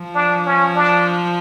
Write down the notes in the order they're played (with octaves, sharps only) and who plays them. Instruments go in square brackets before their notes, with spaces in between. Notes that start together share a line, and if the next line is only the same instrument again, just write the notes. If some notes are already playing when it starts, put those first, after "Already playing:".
Already playing: [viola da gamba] F3
[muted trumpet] D4
C#4
D4